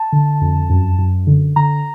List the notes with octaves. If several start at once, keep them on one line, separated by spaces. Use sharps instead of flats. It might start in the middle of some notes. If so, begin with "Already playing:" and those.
Already playing: A5
D3
F2
F#2
F#2
D3
D3 A#5